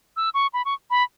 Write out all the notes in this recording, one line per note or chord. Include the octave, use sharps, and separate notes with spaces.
E6
C#6
B5
C#6
B5